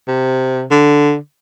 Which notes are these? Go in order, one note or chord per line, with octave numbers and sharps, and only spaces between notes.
C3
D3